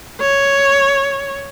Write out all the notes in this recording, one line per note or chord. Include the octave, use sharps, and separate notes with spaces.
C#5